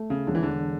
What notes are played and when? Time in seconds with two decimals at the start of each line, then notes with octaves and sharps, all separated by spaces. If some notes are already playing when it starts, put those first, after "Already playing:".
Already playing: A3
0.10 C#3
0.27 E1 D3
0.35 E3
0.43 D3